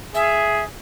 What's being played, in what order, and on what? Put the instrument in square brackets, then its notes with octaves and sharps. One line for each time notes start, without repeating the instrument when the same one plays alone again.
[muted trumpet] G#4 [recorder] E5